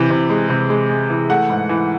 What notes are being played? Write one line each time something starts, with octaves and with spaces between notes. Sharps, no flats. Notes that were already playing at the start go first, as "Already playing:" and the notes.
Already playing: C3 E3
C3
G#3
C3
G#3
G#3
E3
A3 F#5
G#2
E3